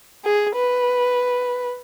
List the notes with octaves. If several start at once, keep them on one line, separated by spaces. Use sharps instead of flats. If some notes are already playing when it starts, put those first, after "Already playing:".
G#4
B4